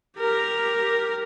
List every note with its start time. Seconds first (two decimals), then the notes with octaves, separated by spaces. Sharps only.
0.19 G4 A#4